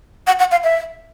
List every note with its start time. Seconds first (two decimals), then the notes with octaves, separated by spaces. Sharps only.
0.27 F#5
0.39 F#5
0.51 F5
0.64 E5